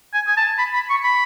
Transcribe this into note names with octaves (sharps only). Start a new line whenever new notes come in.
G#5
G#5
A5
B5
B5
C#6
B5